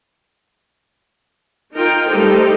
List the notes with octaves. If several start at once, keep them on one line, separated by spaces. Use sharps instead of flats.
D#4 F4 A#4 F5 G5 A#5
G3 A3 D#4 G4 A4 C5